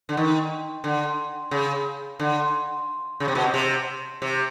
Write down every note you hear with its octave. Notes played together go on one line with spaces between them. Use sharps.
D3
D#3
D3
C#3
D3
C#3
C3
B2
C3
C3
C3